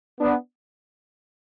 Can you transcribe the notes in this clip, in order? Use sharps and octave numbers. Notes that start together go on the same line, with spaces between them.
B3 D4